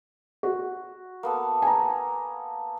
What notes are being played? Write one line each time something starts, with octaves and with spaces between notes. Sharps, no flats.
F#4
A#3 B3 A4
G#5 A#5